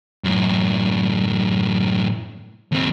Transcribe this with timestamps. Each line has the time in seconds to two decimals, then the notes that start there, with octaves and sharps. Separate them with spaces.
0.24 F#2 A2
2.72 D#2 C4